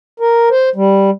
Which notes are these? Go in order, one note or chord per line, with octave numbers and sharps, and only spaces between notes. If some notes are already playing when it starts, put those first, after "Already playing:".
A#4
C5
G3